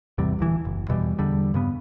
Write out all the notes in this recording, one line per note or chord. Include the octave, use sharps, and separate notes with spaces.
A1 E2 C3 G3
D#1 D2 E3
F#1
E2 B2 E3 G3
E2 D3 G3
G2 C#3 B3